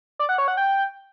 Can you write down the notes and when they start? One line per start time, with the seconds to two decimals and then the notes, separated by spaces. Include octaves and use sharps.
0.19 D5
0.29 F#5
0.38 C#5
0.48 F#5
0.57 G5